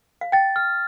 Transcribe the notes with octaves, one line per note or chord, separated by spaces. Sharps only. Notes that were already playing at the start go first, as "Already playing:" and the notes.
F5
G5 A6
F6